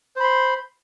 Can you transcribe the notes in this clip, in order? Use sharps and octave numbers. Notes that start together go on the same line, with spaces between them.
C5 B5 C6